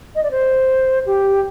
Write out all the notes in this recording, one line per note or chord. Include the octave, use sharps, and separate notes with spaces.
D#5
D5
C5
G4